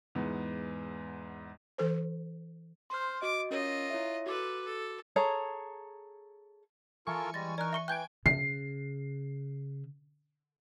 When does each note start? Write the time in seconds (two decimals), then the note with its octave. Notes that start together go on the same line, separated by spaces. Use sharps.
0.15 E2 G#2 B3
1.78 E3 A4 C5
2.90 C5 C6 F6
3.22 F#4 D#5 D6
3.51 C#4 F4 A#4 C#5 D#5
3.90 E4 C#5 E5
4.26 F#4 A4 B4 D6
4.65 A4
5.16 G#4 A4 C#5 A#5
7.07 E3 F4 A4 A#4 G#5 C#6
7.34 G3 G#3 A6 A#6
7.58 D#4 A#4 D5 F#6
7.73 E5 C#6 C#7
7.88 E3 G5 G#5 F#6 G6 D7
8.26 C#3 C7